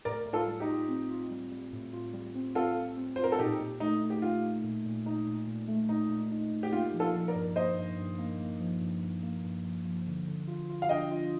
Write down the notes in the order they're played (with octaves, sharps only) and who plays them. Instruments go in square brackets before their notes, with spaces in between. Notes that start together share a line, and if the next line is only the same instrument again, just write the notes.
[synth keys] A2 [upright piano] A#4 D5
[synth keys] A2
[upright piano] F4 A4
[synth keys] G3
[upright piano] D#4 G4
[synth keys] F4
C4
F4
G3
G3
A2
F4
G3
C4
[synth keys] C4 [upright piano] F4 A4
[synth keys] C4
C4
[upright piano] C5
[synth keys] F4
[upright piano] A#4
A4
[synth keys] A#2 [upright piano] D#4 G4
[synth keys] A#2
[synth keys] A3 [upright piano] D#4
[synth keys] D#4
[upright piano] G4
[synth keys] D#4 [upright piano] F4
[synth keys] D#4
A#2
A#2
[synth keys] A#2 [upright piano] D#4
[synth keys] A#2
A#2
A3
[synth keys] A#2 [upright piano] D#4
[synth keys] A#2
D#4
A#2
[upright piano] G4
[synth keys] A#3 [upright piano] F4
[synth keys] F3
[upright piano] F4 A4
[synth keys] F3
[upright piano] A#4 D5
[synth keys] G2
[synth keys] A#3 [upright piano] C5 D#5
[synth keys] G2
G2
A#3
A#3
F3
G2
G2
A#3
G2
F3
F3
D3
D3
F4
F4
[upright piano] F5
[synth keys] D4 [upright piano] D#5 G5
[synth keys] F4